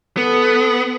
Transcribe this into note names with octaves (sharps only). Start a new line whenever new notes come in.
B3 A4